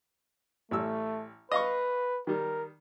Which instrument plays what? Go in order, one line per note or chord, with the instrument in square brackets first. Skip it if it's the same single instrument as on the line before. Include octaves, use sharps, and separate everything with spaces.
[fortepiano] A1 G3 E6 [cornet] A3
[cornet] B4 [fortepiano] D#5 F5 C#6
[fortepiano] D#3 G3 [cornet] A#4